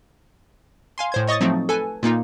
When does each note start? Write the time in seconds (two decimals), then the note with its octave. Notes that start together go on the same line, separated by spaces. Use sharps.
0.98 F5 G#5 C6
1.12 A2 C5 G#6
1.27 C#5 D#5 C#6 D#6 A6
1.41 F3 F#3 A3 C4 D#4
1.69 A4 B4 G#5
2.03 A#2 A#3 D#4 F4